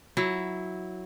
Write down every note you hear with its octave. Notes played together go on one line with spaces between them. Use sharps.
F#3 E4